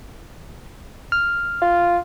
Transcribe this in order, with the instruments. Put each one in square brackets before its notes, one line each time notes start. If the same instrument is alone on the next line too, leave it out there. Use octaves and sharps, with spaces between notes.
[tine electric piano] F6
[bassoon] F4